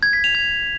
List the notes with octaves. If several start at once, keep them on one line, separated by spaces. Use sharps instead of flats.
G#6
B6
F7
G#6